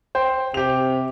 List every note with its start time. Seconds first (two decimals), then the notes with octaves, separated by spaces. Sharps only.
0.15 C5 G5
0.54 C3 G4 F7